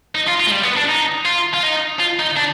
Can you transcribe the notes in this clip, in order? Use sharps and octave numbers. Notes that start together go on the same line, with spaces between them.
D#4
F4
F4
G#3
G3
B3
D4
D#4
F4
F4
D#4
F4
D#4
D4